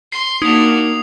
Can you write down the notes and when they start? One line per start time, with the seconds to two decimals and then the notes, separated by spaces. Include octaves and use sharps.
0.12 C6 C7
0.42 A#3 D4 D#4 F#4 D#6 F7